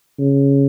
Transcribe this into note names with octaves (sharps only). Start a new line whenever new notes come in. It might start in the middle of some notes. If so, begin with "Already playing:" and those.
C#3